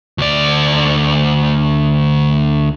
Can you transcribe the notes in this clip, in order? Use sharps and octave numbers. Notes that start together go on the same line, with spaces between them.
D2 D5